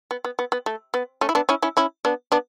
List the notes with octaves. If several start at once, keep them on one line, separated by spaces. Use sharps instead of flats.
B3
B3
B3
B3
A3
B3
A3 C#4
E4
B3 D4
C#4 E4
C#4 E4
C#4 E4
B3 D4
B3 D4